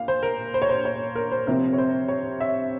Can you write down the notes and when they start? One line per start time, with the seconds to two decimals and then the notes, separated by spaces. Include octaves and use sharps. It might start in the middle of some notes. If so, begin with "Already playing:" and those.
Already playing: A#2 F5
0.08 C5
0.23 A#4
0.54 C5
0.62 C#5
0.69 C5
0.85 C#5
1.15 A#4
1.32 C5
1.47 C3 F3 C4 A#4
1.73 C#5
1.78 C5
2.08 C#5
2.40 E5